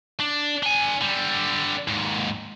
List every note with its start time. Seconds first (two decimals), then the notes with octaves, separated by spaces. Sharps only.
0.20 D4
0.63 D4 G#5
1.02 D3 G3
1.88 D#2 G#2